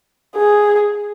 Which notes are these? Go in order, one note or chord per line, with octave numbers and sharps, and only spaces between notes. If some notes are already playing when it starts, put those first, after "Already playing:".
G#4